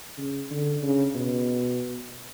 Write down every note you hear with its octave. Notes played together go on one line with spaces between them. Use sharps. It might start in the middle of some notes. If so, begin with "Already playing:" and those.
C#3
D3
C#3
B2